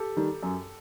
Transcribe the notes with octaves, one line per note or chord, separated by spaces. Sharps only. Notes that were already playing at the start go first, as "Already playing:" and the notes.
Already playing: G4 A4
D#3 G3
F#2